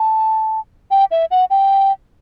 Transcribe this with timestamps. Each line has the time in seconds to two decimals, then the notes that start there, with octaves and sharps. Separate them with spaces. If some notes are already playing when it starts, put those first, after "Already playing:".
Already playing: A5
0.91 G5
1.11 E5
1.31 F#5
1.50 G5